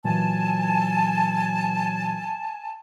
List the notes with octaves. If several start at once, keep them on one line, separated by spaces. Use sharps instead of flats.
A#2 E3 F#3 G#5 A5